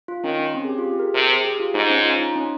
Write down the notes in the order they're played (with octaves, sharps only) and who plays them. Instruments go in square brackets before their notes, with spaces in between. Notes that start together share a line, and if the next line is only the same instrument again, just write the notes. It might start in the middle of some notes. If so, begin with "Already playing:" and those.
[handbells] F4
[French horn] D#3 [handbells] C#4
[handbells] C#4
C4
G#4
G4
F4
G4
G#4
A#4
[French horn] C3 [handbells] A#4
[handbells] G#4
G4
F4
[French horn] G#2 [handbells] D#4
[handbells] C#4
F4
D#4
C#4